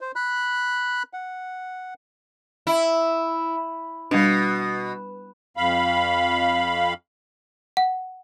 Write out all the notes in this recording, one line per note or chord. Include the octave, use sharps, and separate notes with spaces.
C5
B5 F#6
F#5
E4
B2 G3 D4
F2 F5 B5
F#5